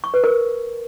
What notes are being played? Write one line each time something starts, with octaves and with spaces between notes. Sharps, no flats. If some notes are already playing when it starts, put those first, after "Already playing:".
C#6
B4
A#4